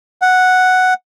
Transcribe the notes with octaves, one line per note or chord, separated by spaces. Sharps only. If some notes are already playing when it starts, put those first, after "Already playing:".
F#5